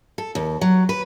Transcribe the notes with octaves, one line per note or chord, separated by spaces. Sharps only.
A4
D#2
F#3
B4